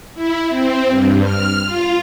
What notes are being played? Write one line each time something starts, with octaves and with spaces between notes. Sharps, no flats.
E4
C4
G2
F6
F4